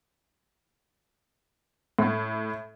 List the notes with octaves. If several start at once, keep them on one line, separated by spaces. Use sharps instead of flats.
A2